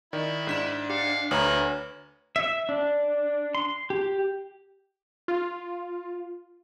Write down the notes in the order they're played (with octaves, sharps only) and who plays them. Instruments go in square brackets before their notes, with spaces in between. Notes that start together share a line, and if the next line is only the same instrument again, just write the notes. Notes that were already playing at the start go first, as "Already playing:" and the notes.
[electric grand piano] D#3 [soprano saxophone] E4 [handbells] D5
[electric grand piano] G#2 B6 E7 [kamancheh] D4
[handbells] G4 [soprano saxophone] F5
[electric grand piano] D2 A#5 [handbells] B4 C#5 F6 [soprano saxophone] B5
[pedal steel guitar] E5
D4
C6
G4
[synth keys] F4